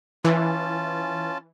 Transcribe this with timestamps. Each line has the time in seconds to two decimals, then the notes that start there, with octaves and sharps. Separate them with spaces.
0.25 E3 C#4 F4 A5